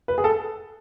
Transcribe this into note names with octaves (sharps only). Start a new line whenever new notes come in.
B4
G#4
A4